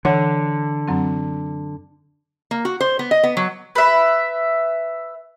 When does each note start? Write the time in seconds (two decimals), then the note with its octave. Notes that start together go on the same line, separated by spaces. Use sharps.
0.05 D3 E3 C#5 F#5
0.88 F#2 F#3 C4
2.51 A#3
2.65 F#4
2.81 C5
2.99 B3
3.11 D#5
3.23 B3
3.37 F#3
3.75 B4 E5